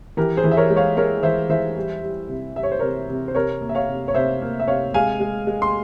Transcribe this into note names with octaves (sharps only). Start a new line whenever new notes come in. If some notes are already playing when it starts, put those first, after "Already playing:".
E3 G4 A#4
G#4 C5
E3
E5
A#4 C#5
G#3
C#5 F5
G#3 A#4 C#5
E3 C5 E5
E3 C5 E5
G3
G3
C3
G3 E5
C#5
C5
C3 A#4 C#5
C3
C5
C3 A#4 C#5
A#3
E5
C#5 F5
C3
C#5
C3 C5 E5
A#3
E5
C3 C#5 F5
G#3 F5 G#5
G#3
G#3
C6